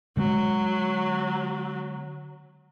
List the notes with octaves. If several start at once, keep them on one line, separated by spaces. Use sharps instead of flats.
D3 F#3 G#3 B3